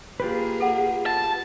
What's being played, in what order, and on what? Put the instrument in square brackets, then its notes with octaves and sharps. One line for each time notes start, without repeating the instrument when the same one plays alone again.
[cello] A#3 G#4 [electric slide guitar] F4 G4 B4
[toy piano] A4 F#5
[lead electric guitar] A5